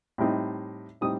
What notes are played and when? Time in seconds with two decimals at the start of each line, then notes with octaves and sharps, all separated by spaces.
0.18 A2 G3 C4 D#4
1.01 A2 G3 C4 D#4 D#6